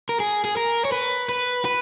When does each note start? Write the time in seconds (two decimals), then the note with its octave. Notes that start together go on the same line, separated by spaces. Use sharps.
0.09 A#4
0.20 G#4
0.45 G#4
0.57 A#4
0.85 C#5
0.92 B4
1.29 B4
1.65 B4